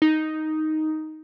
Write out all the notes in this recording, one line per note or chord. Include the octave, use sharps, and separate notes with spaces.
D#4